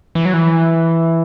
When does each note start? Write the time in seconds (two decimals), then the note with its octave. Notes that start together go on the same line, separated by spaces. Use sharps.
0.15 E3
0.25 F#3
0.34 E3